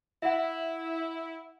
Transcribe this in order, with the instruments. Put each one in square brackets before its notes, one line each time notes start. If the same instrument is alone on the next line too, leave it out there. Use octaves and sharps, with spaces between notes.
[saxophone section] E4 [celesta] E5 F#5